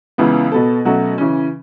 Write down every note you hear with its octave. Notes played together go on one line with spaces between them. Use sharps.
C#2 C#3 E3 B3
B2 B3 A4
B2 F#3 A3 C#4 F#4
C#3 E3 C#4